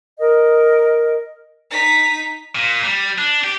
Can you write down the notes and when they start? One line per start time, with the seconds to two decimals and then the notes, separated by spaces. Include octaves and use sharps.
0.18 A#4 D#5
1.71 D#4 B6
2.55 A#2
2.84 G3
3.18 D4
3.44 G4